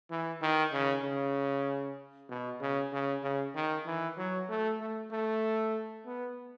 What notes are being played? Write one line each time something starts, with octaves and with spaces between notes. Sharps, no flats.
E3
D#3
C#3
C#3
B2
C#3
C#3
C#3
D#3
E3
F#3
A3
A3
A3
B3